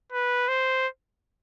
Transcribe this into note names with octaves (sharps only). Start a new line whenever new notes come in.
B4
C5